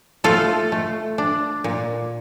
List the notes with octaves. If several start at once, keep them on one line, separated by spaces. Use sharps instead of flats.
A3 F4 A4
A3
D4
A#2